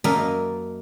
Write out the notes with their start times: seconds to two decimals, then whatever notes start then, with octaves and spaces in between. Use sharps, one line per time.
0.04 F#2 A#3 A#4 D#5 E5 A5